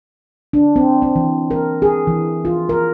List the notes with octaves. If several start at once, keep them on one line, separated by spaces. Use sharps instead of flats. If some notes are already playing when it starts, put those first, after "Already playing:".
D4
C4
C4
E3
A#4
G#4
E3
F4
A#4